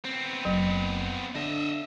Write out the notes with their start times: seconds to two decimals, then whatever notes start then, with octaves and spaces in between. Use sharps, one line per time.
0.05 B3 C4
0.45 F#1 F#3
1.35 D3 D#5 E5